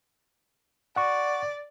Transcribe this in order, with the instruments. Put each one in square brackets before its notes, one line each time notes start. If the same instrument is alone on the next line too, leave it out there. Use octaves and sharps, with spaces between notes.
[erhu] D5 [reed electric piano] F#5 C#6